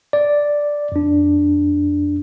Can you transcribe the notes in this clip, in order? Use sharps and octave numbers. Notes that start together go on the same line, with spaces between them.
D5
F2 D4